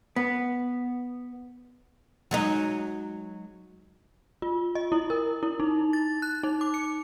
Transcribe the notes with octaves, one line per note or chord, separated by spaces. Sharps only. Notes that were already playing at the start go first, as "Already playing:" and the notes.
B3
F#3 G#3 D#4
F4
D#5
E4
A#4
E4
D#4
A6
F#6
D#4
D6
C#7